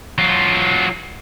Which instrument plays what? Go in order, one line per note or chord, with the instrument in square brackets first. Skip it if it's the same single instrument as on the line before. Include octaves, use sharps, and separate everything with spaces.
[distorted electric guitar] F#3 F4